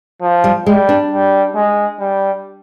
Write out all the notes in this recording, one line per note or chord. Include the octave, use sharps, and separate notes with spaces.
F3
G3
G3 G#3
D4
G3
G#3
G3